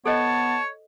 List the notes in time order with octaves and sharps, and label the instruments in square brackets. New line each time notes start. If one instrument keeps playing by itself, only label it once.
[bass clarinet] B3 [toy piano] A4 C5 D#5 [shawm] C#5 [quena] A5